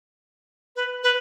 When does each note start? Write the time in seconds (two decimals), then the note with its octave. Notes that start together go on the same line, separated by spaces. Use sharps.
0.76 B4
1.03 B4